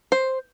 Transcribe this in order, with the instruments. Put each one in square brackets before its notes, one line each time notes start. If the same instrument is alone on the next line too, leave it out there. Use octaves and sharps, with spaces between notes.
[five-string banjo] C5